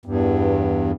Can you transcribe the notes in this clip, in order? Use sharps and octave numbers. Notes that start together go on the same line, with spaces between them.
E2 G2